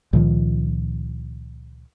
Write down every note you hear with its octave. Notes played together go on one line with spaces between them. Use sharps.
C#2 A#2 D#3 F3